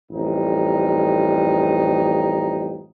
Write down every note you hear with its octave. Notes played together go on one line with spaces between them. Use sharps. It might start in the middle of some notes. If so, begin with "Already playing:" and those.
A1 F2 G3 D#4